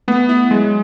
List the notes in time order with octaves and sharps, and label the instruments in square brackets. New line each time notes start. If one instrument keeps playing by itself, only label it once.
[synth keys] A3 [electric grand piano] B3
[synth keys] E4
[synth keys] F#3 [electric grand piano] G#3